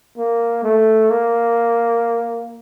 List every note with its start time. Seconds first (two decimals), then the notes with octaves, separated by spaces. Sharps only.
0.17 A#3
0.63 A3
1.10 A#3